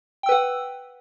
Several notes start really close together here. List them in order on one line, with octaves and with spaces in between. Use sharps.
G5 E6 B4 F#5